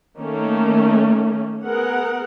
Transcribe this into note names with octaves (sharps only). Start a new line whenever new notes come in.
D#3 A3 A#3 C#4
B3 G#4 A#4 F#5